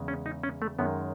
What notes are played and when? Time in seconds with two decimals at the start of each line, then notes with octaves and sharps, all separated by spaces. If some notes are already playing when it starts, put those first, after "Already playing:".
Already playing: E2 C#3 G#3
0.08 C#4
0.26 D#4
0.43 C#4
0.62 A3
0.79 F#2 D#3 G#3 B3